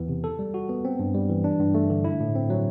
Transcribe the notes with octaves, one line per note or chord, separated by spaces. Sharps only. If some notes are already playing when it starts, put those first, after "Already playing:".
Already playing: E2 E3 B3
C3
A4
G3
F#4
B3
C4
G2
G3
E3
D4
G2
A3
D3
E4
A2
C4
F#3